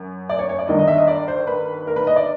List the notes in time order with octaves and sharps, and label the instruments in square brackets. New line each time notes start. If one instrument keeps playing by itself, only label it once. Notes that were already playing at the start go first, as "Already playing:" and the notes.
Already playing: [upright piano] F#2
D5
C#5
C#5
D5
G1 G2 D#3 D#5
D#5
E5
D#5
D5
C5
B4
A#4
B4
D#5
D5